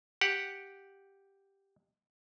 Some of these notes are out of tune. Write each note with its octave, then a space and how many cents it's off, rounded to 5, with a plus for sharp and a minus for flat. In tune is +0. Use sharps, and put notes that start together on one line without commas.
G4 +0 F#5 +0